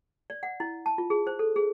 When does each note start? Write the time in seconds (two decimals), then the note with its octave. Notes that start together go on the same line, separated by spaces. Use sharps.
0.30 D5
0.43 F#5
0.60 E4
0.86 A5
0.98 F4
1.10 G#4
1.27 C5
1.39 A4
1.56 G#4